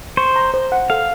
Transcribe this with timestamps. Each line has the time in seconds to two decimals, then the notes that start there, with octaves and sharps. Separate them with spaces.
0.17 C5 C#6
0.36 A#5
0.54 C5
0.72 F#5
0.90 A4 F5